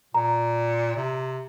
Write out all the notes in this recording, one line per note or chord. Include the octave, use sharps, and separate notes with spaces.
A#2 A#5
C3